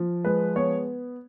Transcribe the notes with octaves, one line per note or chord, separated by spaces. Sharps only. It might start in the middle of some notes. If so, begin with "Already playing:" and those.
Already playing: F3
G#3 B4
B3 C#5